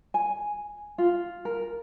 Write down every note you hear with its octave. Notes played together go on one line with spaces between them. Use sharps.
G#5
F4
A#4